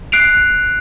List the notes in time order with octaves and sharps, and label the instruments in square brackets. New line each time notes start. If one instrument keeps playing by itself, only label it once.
[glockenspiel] F#6 C7 D7 F7